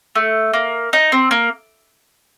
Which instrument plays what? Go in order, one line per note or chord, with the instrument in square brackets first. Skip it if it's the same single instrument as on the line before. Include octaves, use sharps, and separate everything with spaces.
[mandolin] A3
A#3
D#4
C4
A#3